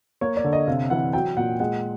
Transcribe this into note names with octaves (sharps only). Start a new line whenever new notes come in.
A#3 C#5
D5
D3
D#5
C3 F5
E3 F#5
F#3 G5
A#2 F#5
G#3 F#5